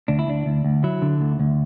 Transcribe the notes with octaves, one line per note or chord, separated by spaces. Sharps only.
D2 D4
E4
D2 D4
D2
D2
F#3 E4
D3
D2
D2